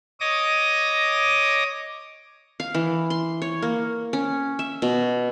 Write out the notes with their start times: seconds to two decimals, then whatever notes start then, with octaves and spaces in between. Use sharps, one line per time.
0.20 C#5 D#5 D6 D#6 A#6
2.60 F5
2.74 E3
3.10 C6
3.42 C#5
3.62 A#3
4.13 C#4
4.59 E5
4.82 B2